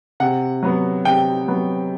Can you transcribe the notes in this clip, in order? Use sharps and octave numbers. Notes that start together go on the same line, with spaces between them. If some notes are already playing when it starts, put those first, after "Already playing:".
C3 F#5
F#3 B3
C3 G5
F#3 B3